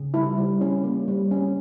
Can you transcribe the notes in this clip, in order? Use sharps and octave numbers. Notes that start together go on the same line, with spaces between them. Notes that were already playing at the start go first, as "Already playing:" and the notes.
Already playing: C#3
G3 E4
G3
C#4
A#3
G3
C#4